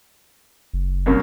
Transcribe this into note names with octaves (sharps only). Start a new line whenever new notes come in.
F#1
C2 F#2 A#3